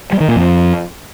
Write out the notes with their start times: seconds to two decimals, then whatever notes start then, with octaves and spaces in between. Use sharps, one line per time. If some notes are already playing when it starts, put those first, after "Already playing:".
0.13 G3
0.20 D#3
0.28 A#2
0.36 F2